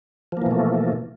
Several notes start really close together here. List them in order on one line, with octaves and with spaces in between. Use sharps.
F3 A#3 E3 B2 A3